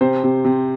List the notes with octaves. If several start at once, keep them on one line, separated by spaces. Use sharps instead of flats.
C3 C5
C3
C3